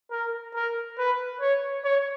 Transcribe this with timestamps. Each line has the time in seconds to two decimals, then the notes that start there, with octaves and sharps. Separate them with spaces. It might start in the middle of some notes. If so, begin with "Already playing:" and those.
0.11 A#4
0.54 A#4
0.98 B4
1.41 C#5
1.84 C#5